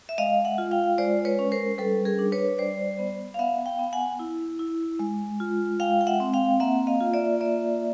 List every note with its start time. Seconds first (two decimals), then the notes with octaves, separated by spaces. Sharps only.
0.09 E5
0.18 G#3 D#5 F5
0.45 E5 F#5
0.58 F4
0.71 F5 G5
0.98 G#3 C5 D5
1.25 B4 C#5
1.39 C#4
1.52 A#4 C5
1.78 G3 A4 B4
2.05 G#4 A#4
2.19 D4
2.32 B4 C#5
2.58 G3 C5 D5
2.99 B3
3.34 F5
3.39 B3 E5 F#5
3.66 F5 G5
3.79 B3
3.93 F#5 G#5
4.19 E4
4.59 E4
5.00 G#3
5.40 F4
5.80 G#3 F5 G5
6.01 G5
6.07 E5 F#5
6.20 C4
6.33 F5 G5
6.60 A#3 E5 F#5
6.87 D#5 F5
7.00 F4
7.13 D5 E5
7.40 A#3 D5 E5